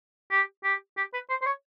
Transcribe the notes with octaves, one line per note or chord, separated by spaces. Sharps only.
G4
G4
G4
B4
C5
C5
C#5